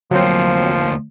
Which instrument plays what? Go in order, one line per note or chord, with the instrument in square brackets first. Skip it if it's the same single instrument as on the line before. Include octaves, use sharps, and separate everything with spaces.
[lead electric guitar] D2 A#3 [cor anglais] F3 [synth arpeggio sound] F#3 C4